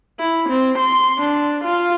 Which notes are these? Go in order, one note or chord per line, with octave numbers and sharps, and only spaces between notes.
E4
C4
C6
D4
F4